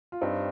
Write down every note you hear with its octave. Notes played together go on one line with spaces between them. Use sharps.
F4
G2 C4 D#4